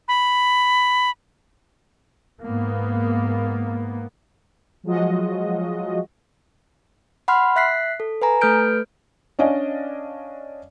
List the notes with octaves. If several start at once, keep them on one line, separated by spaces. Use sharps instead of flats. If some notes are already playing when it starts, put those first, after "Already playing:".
B5
G#2 A#3 B3
F3 F#3 G#3 F4 F#4 D#5
F#5 B5 C6 F6
E5 F#6 B6 C7
A4
B4 G#5 A#5
A3 A4 B4 F6 G6 D7
C#4 D4 D5 D#5 F5 G#5